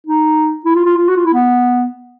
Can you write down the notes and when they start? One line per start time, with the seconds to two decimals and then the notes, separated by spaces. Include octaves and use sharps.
0.07 D#4
0.65 E4
0.75 F4
0.85 F4
0.97 F4
1.09 F#4
1.16 F4
1.26 E4
1.34 B3